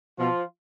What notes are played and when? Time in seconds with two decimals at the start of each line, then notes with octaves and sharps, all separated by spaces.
0.18 B2 F3 F4